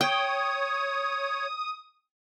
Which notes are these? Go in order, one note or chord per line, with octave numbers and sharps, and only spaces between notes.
C#5 G5 D#6